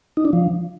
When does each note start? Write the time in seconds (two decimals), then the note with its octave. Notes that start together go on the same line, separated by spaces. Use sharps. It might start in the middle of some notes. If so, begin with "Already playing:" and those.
0.17 D#4
0.25 D4
0.33 F3